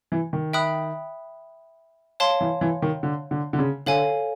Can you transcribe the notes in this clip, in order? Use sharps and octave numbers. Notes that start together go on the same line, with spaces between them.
E3
D#3
E5 G5 B5 D#6 F#6
C#5 F5 A5 C6
E3
E3
D#3
D3
D3
D3
C#3
D3 A4 C#5 F5 G#5